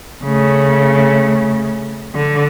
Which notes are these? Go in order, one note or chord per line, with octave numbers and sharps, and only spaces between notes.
C#3 A3
D3